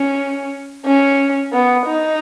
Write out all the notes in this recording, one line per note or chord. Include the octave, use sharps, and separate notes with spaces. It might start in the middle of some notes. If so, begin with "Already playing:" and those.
Already playing: C#4
C#4
B3
D#4